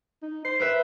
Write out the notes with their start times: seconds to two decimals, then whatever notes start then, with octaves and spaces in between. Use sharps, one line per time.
0.22 D#4
0.45 C5 C7
0.60 A#4 B4 E5